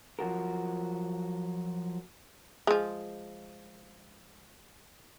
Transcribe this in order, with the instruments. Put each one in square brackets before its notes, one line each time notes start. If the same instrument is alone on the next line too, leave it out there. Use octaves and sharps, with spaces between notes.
[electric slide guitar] F3 F#3 F#4 A#4
[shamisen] F3 G#3